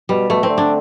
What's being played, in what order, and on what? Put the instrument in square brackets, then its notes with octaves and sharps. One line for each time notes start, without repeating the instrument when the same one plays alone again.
[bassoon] B2 [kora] G3
[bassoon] B2 [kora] A3
[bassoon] E3 [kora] C4
[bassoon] D3
[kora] D4